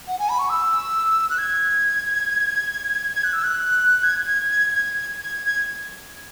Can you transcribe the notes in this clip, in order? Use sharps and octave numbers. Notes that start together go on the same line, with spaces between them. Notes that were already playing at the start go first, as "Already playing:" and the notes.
F#5
G#5
B5
C#6
E6
F#6
G#6
G#6
F#6
E6
F#6
G#6
G#6
G#6
G#6
G#6
G#6
G#6